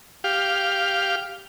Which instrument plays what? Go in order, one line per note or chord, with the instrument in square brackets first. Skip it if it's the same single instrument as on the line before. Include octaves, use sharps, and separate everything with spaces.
[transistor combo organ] G4 F5